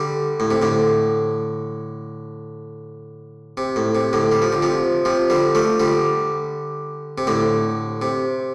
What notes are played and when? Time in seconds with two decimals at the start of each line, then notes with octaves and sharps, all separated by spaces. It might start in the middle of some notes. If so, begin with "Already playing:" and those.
Already playing: D3 G3
0.40 A2
0.51 C3
0.62 A2 D3
3.57 C3
3.76 A2
3.95 C3
4.13 A2 D3
4.32 G3
4.42 F3
4.52 D3
4.62 C3 F3
5.05 C3 F3
5.30 D3 G3
5.55 F3 A3
5.80 D3 G3
7.18 C3
7.27 A2 D3
8.02 C3